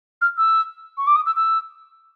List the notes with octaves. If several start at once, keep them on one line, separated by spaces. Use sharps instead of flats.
F6
E6
C#6
D6
D#6
E6
E6